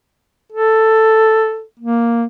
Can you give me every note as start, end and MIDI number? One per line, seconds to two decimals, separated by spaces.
0.52 1.63 69
1.80 2.26 58